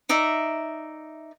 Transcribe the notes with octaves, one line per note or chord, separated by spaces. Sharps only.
D#4 D5 E5 A#5